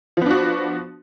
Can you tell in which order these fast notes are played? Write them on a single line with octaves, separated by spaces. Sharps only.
F3 B3 D4 F#4